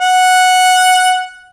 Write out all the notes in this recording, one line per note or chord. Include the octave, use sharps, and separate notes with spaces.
F#5